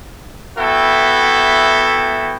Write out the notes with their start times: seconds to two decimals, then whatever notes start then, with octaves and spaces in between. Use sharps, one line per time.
0.57 B3 E4 F#4 A4 E5 G5